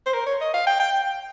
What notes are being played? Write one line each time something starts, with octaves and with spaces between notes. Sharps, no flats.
C5
A#4
C#5
D#5
F5
G5
G5